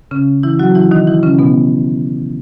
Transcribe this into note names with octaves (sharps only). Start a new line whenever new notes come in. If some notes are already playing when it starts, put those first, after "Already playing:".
C#3 C#4
E3 E4
F#3 F#4
E3 E4
D#3 D#4
E3 E4
C#3 C#4
B2 B3